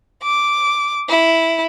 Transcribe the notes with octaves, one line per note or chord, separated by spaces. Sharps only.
D6
E4